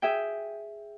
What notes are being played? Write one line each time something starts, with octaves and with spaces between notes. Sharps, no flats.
G#4 E5 G5